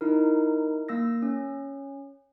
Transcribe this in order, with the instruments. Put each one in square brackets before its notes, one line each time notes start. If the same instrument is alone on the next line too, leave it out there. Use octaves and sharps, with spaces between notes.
[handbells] D#4 E4 A#4
A#3 E6 A#6
C#4